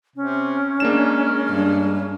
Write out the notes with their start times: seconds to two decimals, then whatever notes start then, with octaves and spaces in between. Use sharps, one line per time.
0.16 C3 C#4
0.80 G#3 A#3 D4 E7
1.50 G2